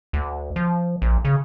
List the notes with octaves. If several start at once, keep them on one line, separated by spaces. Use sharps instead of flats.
D2
F3
A#1
C#3